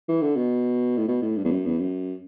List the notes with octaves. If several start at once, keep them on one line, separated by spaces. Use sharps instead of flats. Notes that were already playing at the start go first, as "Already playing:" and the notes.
E3
D3
B2
A2
B2
A2
G2
E2
F#2
E2
F#2